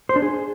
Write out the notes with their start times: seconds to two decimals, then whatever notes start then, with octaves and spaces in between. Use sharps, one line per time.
0.09 C5
0.16 D4
0.22 G#4